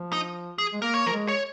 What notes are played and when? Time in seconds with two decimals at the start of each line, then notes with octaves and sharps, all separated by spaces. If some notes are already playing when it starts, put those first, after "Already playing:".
Already playing: F3
0.13 D#4
0.58 G#4
0.73 G#3
0.82 A#3 A#4
0.94 C#5
1.06 F3 A#4
1.12 G#3
1.28 C#5